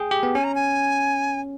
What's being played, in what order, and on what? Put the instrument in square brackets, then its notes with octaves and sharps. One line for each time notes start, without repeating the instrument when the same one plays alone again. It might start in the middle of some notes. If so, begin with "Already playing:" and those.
Already playing: [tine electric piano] G#4 G5
G4
B3
[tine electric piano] C#4 [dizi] G#5
[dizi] A#5
G#5